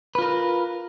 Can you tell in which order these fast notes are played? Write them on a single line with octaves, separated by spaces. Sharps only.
B4 F4 A#4